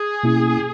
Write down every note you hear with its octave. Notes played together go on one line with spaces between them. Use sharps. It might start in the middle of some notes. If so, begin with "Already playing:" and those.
Already playing: G#4
B2 A#3 C#4 E4